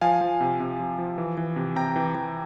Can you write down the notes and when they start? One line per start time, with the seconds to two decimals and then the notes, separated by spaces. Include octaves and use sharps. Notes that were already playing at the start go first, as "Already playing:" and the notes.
0.01 F3 F5 G#5
0.21 F3
0.40 C3
0.60 C3
0.80 F3
0.98 F3
1.18 E3
1.37 E3
1.56 C3
1.76 C3 G5 A#5
1.96 E3
2.15 E3